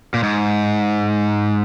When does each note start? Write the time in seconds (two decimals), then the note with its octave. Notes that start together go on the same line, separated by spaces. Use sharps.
0.14 A#2
0.23 G#2